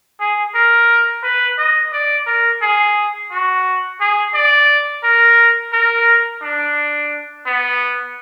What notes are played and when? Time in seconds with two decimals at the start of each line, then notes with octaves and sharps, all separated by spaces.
0.20 G#4
0.54 A#4
1.23 B4
1.58 D#5
1.93 D5
2.27 A#4
2.62 G#4
3.31 F#4
4.00 G#4
4.34 D5
5.03 A#4
5.72 A#4
6.42 D4
7.46 B3